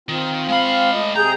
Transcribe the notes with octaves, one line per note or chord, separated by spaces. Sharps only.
D#3 C4 F4
G#3 F5 B5
A3 D#5
C3 G#4 G5 A#5 G6